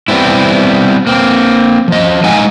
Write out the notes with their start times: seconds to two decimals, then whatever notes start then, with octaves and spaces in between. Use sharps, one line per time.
0.08 G3 B3 C4 E4
1.07 A#3 C4
1.88 F3 D#5
2.24 G#3 D#4 F5 F#5 G#5